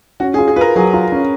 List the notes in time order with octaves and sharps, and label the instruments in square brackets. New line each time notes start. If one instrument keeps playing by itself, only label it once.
[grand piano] C#4 [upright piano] F#4
[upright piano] G#4
[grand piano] F4
[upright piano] G#4
[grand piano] F4 [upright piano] A#4 B4
[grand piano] F#3 [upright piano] G#4
[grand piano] F4
C#4